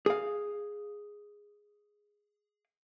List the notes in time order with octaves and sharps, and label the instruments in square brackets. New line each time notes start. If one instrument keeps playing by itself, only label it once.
[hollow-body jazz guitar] G#4 F5